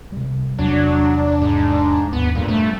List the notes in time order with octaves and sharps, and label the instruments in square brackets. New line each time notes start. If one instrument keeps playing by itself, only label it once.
[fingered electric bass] C3 G3
[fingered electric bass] E2 C3 [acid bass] F#3 [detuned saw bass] D4
[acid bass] G#2
[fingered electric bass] D#2 G#2 [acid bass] B3
[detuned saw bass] F2 [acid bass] A#2 [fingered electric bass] G3 D4
[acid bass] A3